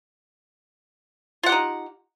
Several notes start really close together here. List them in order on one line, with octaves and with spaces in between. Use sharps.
F4 F#5 G4 D#4